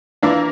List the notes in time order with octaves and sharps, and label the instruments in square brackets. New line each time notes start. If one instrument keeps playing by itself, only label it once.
[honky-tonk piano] E3 A#3 E4 [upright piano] D4 F4